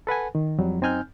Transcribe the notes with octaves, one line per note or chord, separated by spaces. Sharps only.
A4 B4 F#5 G#5
D#3
F2 F#3 G3
F#2 C4 D#4 G#5 F6 G6